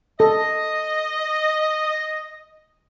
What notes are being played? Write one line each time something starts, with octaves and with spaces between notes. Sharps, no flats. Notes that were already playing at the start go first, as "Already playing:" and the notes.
A4 D#5